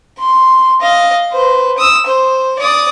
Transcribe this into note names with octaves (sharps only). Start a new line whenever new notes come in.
C6
D#5 F5
B4 C5
D#6 E6
C5
D5 D#6